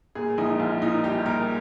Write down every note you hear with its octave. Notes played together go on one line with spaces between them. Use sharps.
A#2 G#4
A#1 D#4
A#1 F4
A#2 D#4
G3 G4
A#2 A#4